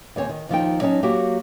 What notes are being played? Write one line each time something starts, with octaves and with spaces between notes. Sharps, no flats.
D#2 C4 C#5 G#5
D#3
D#2 F3 D#4 G5
F#3 C#4 D#4 A5
F#3 A#3 F#4 G4